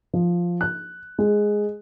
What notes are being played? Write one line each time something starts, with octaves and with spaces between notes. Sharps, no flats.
F3
F#6
G#3